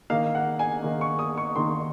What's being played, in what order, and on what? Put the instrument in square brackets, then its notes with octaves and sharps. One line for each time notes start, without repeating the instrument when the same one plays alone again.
[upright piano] D#3 A#3 D#4 F5
F#5
G#5
D#3 A#3 D#4
C#6
D#6
C#6
D#3 A#3 D#4 C6